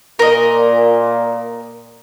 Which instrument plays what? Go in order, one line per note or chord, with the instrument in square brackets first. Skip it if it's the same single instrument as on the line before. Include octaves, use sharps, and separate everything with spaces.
[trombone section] A#2 [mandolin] A#4 D#5